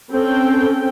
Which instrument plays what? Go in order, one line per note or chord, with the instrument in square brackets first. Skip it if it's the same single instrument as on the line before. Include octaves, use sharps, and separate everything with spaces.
[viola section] C4 C#4 A4 G5